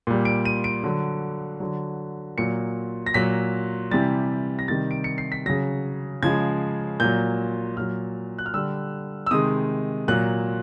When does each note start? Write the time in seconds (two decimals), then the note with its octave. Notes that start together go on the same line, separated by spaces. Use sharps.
0.07 A#2 G3
0.25 D7
0.45 D#7
0.64 D7
0.84 D3 F#3
1.60 D3 F#3
2.38 A#2 F#3 C#7
3.06 A#6
3.14 A#2 F#3 B6
3.91 C3 E3 G3 A6
4.59 A#6
4.68 C3 D#3 G3 A6
4.91 D7
5.04 C#7
5.18 C7
5.32 B6
5.46 C#3 F#3 A#6
6.23 C#3 F3 G#3 G#6
7.00 A#2 F#3 G6
7.77 A#2 F#3 F6
8.38 F#6
8.46 F6
8.54 D3 G3 E6
9.26 E6
9.31 C3 D#3 G#3 D#6
10.08 A#2 F#3 F#6